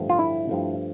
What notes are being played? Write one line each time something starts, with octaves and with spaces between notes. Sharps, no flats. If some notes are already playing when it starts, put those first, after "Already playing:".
Already playing: A1 G2 D3 F3 A3
F4
E4
G2 F3 A3